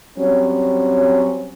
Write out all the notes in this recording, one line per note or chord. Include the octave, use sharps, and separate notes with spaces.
F#3 G3 C4 C#4